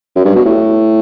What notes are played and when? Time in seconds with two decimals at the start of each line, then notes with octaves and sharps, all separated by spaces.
0.16 F#2
0.25 G2
0.35 B2
0.45 A2